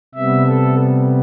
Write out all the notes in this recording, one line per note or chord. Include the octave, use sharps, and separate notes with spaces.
C3 G3 B3 E5
A4